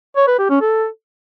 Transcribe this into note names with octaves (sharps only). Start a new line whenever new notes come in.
C#5
B4
G4
C#4
A4